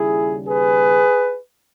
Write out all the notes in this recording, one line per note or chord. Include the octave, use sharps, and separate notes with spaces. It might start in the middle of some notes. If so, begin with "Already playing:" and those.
Already playing: D#2 C#3 G3 E4 G#4
G#4 B4